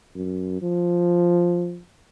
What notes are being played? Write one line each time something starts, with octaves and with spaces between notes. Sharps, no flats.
F#2
F3